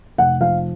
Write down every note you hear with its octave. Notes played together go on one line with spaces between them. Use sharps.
F1 F#5
F3 F5